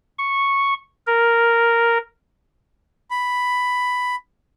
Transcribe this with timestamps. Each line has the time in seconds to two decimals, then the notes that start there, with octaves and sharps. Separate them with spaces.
0.18 C#6
1.07 A#4
3.11 B5